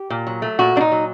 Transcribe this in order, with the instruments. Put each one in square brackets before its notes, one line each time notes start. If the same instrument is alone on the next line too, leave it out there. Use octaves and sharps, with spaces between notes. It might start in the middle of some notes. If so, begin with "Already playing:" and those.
Already playing: [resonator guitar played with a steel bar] G4
A#2
F#3
A3
A#2 F#4
A#2 D4
D#4
F#3